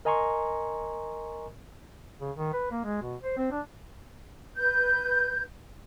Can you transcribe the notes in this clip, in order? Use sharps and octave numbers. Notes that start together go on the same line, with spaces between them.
A#4 D#5 G#5 A#5 C6 C#6
C#3
D#3
B4
A#3
G#3
B2
C5
C4
D4
B4 G6